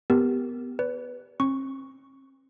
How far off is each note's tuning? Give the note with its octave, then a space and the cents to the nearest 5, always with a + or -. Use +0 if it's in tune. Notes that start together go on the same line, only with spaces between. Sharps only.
B3 +10 G4 +0 A#4 -5
B4 +5 D5 -45
C4 +45 C#6 +0